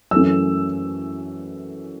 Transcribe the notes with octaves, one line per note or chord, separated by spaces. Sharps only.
F#2 E3 A3 C#4 E6